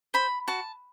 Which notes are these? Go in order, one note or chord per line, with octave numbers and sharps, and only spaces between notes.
C5 B5
F#4 A5